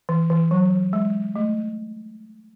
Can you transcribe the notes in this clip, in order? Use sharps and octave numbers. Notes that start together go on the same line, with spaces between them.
E3
E3
F#3
G#3
A3